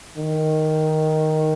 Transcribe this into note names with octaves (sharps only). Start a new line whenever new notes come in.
D#3